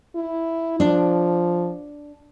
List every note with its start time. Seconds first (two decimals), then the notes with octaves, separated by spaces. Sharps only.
0.16 E4
0.80 F3 D4